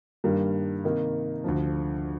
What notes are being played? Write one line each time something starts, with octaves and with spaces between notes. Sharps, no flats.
G2 D#3 G3 A#3
C3 D#3 A#3 D#4
D2 D3 F3